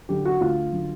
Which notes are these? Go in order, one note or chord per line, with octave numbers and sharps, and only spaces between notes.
D3 F#3 G4
F#4
D2 F4
D3 F#3